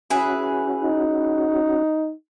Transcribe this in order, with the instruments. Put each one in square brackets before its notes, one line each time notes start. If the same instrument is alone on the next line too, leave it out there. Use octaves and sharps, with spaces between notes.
[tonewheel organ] C#4 F#4 [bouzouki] E4 G#4 B4
[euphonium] D#4